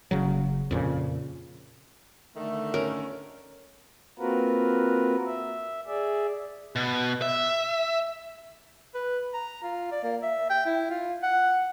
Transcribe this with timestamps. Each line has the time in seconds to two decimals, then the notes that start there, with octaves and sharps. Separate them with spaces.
0.11 F#1 C#3 F#3
0.71 F2 A#2 C#3
2.36 D3 D#3 A3
2.74 C#4 A#4
4.19 A#3 C4 F4 F#4 A#4 B4
5.26 E5
5.87 G#4 D5 E5
6.76 B2
7.22 E5
8.95 B4
9.34 A#5
9.63 F4
9.92 D5
10.04 A#3
10.23 E5
10.50 G5
10.66 E4
10.90 F4
11.23 F#5